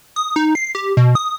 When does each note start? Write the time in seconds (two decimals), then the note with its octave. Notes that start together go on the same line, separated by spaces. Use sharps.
0.16 D#6
0.36 D#4
0.55 C7
0.75 G4
0.97 B2
1.15 D#6